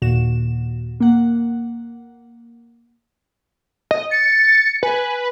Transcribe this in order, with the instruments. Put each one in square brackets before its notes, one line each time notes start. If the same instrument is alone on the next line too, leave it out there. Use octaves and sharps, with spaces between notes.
[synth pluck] D#2 A#2 F#4 E7
A#3 F#5
[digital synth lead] D#5
[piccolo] A6 [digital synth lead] C#7
[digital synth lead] B4 [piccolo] G#5